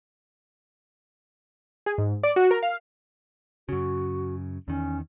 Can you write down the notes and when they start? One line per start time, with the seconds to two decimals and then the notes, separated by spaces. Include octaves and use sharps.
1.86 G#4
1.98 G#2
2.23 D5
2.36 F#4
2.51 A#4
2.63 F5
3.69 F#2 C#3 F#4
4.68 E2 D#3 C#4